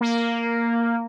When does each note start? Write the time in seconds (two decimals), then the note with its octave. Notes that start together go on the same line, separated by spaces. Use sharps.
0.01 A#3